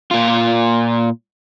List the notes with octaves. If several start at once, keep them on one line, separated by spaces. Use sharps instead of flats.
A#2 F4